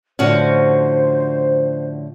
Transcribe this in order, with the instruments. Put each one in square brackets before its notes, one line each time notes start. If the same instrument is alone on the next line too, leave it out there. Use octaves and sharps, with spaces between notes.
[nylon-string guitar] A2 D3 F3 [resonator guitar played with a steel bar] C#4 F#4 [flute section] C5